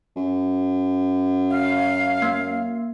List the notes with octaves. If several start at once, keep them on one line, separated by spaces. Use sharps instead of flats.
F#2
F5
A#3